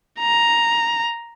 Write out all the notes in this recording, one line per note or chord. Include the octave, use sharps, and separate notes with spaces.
A#5